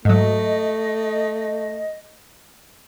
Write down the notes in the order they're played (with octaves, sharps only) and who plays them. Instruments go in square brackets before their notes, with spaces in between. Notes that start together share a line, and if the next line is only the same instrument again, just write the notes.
[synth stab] G#2 F#3 [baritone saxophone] A3 [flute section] D#5